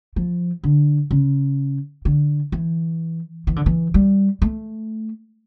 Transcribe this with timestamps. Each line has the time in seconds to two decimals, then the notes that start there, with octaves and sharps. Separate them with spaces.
0.16 F3
0.63 D3
1.11 C#3
2.05 D3
2.52 E3
3.47 E3
3.56 D3
3.66 E3
3.94 G3
4.42 A3